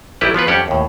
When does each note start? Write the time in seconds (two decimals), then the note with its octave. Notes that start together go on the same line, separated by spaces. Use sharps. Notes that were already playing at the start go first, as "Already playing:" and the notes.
0.21 A1 F#3 G3 E4 G4 B4
0.34 F3 B3 F4 B4
0.47 F2 G3 C#4 G4 F#5
0.68 D#2 A2